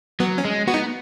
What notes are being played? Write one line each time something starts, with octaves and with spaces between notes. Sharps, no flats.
F#3 B3
C#4
G#3
B3 F#4
D#4